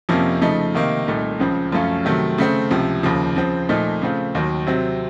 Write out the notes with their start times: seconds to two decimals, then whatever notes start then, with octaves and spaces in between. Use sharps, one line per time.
0.09 F2 C3 F3 A#3 C#4
0.42 C#3 F3 A3 D#4
0.74 C3 D#3 A#3 D#4
1.07 C2 A#2 A3 D#4
1.40 C#2 C#3 F3 C4
1.72 F#2 F3 A3 C#4 F4
2.05 C3 D#3 F#3 A3
2.38 C#3 A3 C4
2.71 C#2 C3 F3
3.03 D#2 C#3 F3
3.36 C#3 F3 C4
3.69 A#2 F3 A3 D#4
4.02 C#3 A3 C4 F4
4.35 D#2 D#3 F#3
4.67 C3 F#3 C4